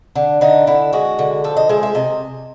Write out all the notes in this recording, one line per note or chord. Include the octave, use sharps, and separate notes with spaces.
D3
D3 D#4
D3 E4
G#3 F#4
D3
F3 A4
D#5
G#3 E5
E5
C3 D#5